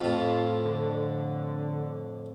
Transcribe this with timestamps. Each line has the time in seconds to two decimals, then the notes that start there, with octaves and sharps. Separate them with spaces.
0.01 F2 A2 F4
0.65 D3